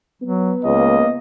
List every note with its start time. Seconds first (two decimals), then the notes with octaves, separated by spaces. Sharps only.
0.22 F#3 B3
0.65 C#2 A#3 D#5